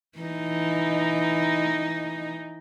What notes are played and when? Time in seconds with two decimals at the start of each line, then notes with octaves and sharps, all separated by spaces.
0.19 E3 D#4